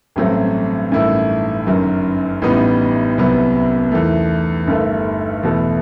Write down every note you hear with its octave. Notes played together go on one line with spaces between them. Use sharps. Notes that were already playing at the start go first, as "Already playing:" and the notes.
A1 G2 F#3 A3 C4
A1 G2 D#3 A3 E4
G1 F#2 D#3 F#3
A1 A2 G3 B3 D#4
C2 C3 F#3 B3
E2 D#3 A3
G1 G2 D#3 A3
E2 B2 A3